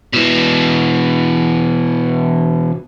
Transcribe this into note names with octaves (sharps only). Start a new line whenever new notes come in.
B2 E3